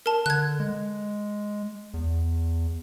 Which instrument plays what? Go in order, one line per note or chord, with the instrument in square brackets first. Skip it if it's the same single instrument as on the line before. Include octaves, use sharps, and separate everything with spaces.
[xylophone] A#4 A5
[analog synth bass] D3 [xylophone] F#6 G#6
[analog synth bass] G#3
E2